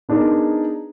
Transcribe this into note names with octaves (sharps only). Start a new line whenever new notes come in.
B3 D4 D#4 G#4 A#4